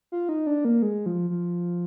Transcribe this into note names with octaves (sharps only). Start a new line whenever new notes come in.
F4
D#4
D4
A#3
G#3
F3
F3